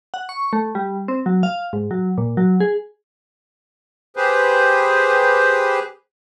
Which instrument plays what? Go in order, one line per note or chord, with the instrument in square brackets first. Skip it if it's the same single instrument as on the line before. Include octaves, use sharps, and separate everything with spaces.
[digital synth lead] F#5
C#6
A3
G3
C4
F#3
F5
G#2
F#3
A#2
F#3
G#4
[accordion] G4 G#4 B4 C5